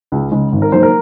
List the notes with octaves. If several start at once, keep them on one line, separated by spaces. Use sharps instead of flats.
C#2
C#3 G#3
G#1
A#4
G#2 F#3 A#3 C5
A#4